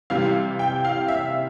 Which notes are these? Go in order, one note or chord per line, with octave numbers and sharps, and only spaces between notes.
C3 E3 G3 F5
G5
F5
E5